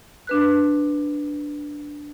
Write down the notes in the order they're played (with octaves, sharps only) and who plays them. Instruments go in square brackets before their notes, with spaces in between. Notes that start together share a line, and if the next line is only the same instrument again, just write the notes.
[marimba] D4 B4 F#6